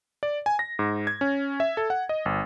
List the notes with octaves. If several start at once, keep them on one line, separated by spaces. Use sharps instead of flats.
D5
G#5
A#6
G#2
G#6
C#4
E5
A4
F#5
D#5
G1